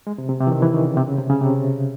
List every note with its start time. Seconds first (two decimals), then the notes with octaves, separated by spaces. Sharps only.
0.07 G#3
0.18 C3
0.29 C3
0.41 C3
0.47 E3
0.52 D#3
0.62 E3
0.74 D#3
0.85 C#3
0.97 C3
1.08 C#3
1.18 C3
1.30 C#3
1.41 C3